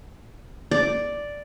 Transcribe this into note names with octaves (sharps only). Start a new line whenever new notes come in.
D5